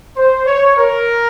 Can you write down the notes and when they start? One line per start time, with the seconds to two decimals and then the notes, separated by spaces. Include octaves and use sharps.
0.17 C5
0.47 C#5
0.78 A#4